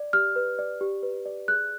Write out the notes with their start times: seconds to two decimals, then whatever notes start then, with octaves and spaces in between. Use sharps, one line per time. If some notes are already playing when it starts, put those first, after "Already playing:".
Already playing: D5
0.13 G4 F6
0.36 B4
0.59 D5
0.81 G4
1.03 B4
1.26 D5
1.48 G#4 F#6